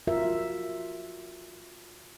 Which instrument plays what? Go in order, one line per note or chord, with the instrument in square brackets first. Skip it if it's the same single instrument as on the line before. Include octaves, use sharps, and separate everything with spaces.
[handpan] F4 F#4 A#4 E5